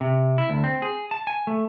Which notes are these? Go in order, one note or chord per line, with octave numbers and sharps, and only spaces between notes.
C3
E4
D2
C4
G#4
A5
G#5
A3